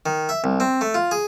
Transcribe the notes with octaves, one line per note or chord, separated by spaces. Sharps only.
D#3
E5
C2
C4
A3
F4
G#4